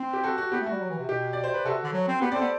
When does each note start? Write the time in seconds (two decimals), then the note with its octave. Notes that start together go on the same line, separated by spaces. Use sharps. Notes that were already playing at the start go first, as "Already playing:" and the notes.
Already playing: C4
0.13 G4
0.24 F#4 A4
0.38 F#4
0.52 B3 G4
0.61 A3
0.66 G3 F#4
0.80 F#3
0.90 E3
0.99 C3
1.08 B2 G4
1.33 D5
1.44 C5
1.54 B4
1.65 C3 F#4 A4
1.84 D3
1.93 F#3
2.07 C4
2.21 B3 G4 B4
2.31 C4 D5
2.35 A4 C5
2.41 B3